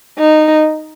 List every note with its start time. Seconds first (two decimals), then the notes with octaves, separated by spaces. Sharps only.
0.19 D#4